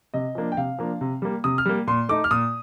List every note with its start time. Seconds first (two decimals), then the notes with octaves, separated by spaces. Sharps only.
0.14 C3 D#5
0.35 F3 A#3 D4
0.52 G5
0.57 C3 F5
0.79 F3 A#3 D4
1.01 C3
1.22 G3 A#3
1.44 C3 D#6
1.58 F6
1.66 G3 A#3
1.87 A#2 C6
2.09 A3 D#4 D6
2.24 F6
2.31 A#2 D#6